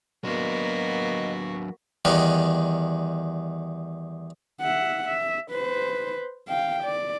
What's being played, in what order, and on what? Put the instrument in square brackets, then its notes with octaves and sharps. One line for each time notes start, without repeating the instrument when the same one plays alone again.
[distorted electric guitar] F#3 D4 [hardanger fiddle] A#3 B3 [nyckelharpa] F#4 [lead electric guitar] D#5 C6
[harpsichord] E2 D#3 G3
[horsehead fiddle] E5 F#5
E5
B4 C5
F5 G5
D5